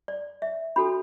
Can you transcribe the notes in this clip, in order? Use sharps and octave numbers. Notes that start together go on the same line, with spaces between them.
D5
E5
D4 F#4 A4 B5